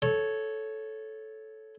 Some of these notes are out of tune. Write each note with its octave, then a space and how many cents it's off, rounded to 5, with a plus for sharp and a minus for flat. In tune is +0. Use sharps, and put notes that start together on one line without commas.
A4 -10 C#5 +0